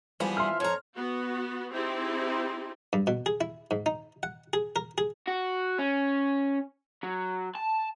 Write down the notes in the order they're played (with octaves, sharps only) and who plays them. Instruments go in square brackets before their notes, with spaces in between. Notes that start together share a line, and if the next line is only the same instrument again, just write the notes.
[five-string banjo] E3 F3 F4 [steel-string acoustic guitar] G3 B3 G#4
[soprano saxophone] E5 [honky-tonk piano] C6 F6
[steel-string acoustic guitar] F2 A#5 [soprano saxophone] C#5
[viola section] B3 F#4
C4 D#4 E4 G4 G#4
[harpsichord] G2
B2
G#4
E4
G#2
D#4
F#5
G#4
A#4
G#4
[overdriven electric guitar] F#4
C#4
F#3
A5